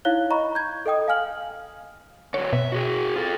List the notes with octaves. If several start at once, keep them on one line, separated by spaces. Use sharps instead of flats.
D#4 E4 C#5 F5 F#6 G7
D#5 A#5 B5 C#6
G6 G#6
A4 D#5 G5 D#6
F5 G#5 F6 F#7
D3 F#3 C#5
B2 E5
F#4 G#4
F4 A4